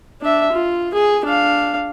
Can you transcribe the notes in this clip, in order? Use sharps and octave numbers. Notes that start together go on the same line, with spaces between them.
D4 E5
F4
G#4
D4 F5